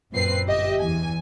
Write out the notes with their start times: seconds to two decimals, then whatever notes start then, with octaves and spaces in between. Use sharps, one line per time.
0.12 F#2 A#2 C4 B4 C7
0.46 G1 G4 D#5 E5
0.80 E2 G#5